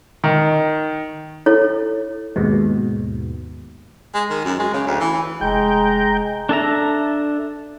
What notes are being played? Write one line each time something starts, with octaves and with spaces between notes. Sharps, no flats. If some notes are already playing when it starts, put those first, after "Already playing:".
D#3
E4 A4 C#5
D#2 G#2 B2
G#3
D#3
F#2
G#3
C#3
D2
E3
F1 G#3 G5 A#5
D4 A4 E5 A#5